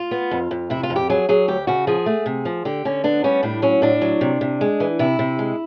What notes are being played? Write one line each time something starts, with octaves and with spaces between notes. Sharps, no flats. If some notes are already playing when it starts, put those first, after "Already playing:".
Already playing: F4
B3
F2
F2
C3 E4
F4
F2
G4
F#3 G#4
F#3 G#4
D2 G4
C#3 F#4
F3 G#4
A3
C3
F3
D3 G4
D3 C#4
B3 D4
G3 C#4
A2 D4
F#3 C#4
A2 D4
F#3
C3
C3
G#3
E3
C3 E4
C3
G#3